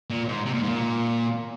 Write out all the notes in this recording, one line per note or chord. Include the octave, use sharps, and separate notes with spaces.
A#2
G#2
C3
A#2
G#2
A#2